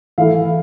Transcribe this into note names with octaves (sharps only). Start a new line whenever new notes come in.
E3 A3 E4 F5